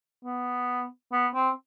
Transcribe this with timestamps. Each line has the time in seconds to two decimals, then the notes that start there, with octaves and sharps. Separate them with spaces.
0.25 B3
1.12 B3
1.35 C4